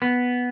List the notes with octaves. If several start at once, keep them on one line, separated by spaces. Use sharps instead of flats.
B3